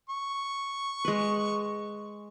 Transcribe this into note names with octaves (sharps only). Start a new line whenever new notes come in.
C#6
G#3 B4